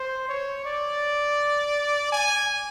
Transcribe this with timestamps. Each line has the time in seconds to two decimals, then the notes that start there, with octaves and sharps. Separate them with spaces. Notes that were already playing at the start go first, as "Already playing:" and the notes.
Already playing: C5
0.29 C#5
0.65 D5
2.13 G#5